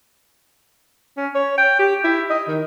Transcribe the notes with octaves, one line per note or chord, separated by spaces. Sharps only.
C#4
C#5
G5
G4
E4
D#5
D#3